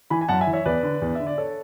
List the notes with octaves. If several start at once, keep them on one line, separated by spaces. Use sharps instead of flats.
E3 G#5 B5
G#5
F#2 F#5 A5
E5 G#5
E3
C#5 E5
E2 B4 D5
D3
E2
E5
D3
D5
A4 C#5